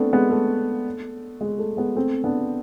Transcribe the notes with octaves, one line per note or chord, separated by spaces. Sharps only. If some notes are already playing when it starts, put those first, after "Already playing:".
Already playing: A3 B3 C4 D4
G#3 B3
A3
G#3
A3
G#3 B3
A3 C4
B3 D4